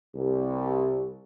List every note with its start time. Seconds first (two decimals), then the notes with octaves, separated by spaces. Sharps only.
0.15 C2